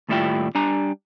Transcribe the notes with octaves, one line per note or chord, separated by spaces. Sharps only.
D#2 A2 G3 E4 F4 G5
G3 D4 G#5 A#5